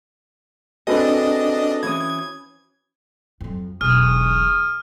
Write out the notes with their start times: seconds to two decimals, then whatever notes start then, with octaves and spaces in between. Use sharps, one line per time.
0.87 C4 D4 F#4 G#4 A4 B4 D#5
1.83 E3 C#4 D#6 G#6
3.41 F2 F#3
3.81 E1 B1 G#4 C#6 D#6 F6